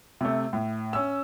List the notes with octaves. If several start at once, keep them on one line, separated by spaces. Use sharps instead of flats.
C3 A3
A2
C#4 E6